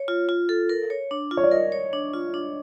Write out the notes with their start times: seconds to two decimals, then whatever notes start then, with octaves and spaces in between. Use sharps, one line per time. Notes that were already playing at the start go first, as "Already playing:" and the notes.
Already playing: C#5
0.08 F4
0.29 F4
0.49 A4
0.69 A#4
0.90 C#5
1.11 D4
1.31 F4
1.37 C#5
1.44 D5
1.52 A#4 D#5
1.72 C#5
1.93 D4
2.13 F4
2.34 D4